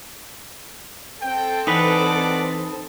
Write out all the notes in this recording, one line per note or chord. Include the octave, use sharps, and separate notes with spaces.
C4 A4 G5
E3 D#4 B4 D5 F#5 D6